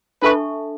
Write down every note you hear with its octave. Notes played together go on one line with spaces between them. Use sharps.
D4 A4 B4 E5 A5 C#6